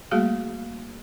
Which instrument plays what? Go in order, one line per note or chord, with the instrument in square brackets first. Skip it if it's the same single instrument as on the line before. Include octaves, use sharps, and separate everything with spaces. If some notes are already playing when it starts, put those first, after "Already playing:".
[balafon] G3 A3 A#3 F#4 G#4 F5